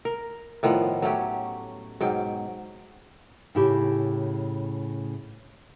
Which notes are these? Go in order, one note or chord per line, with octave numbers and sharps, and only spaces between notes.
A#4
A2 D#3 F3 B3
F#3 A3 C#4 G4
G#2 B2 F#3 G5
A2 C#3 E4 G4